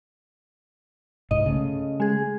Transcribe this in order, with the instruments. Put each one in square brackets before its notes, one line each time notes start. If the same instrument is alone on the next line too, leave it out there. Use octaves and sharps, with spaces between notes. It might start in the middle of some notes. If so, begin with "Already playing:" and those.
[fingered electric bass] C2 G#2 [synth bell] D#5
[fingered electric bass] C#3 A3
[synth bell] G#3 G#4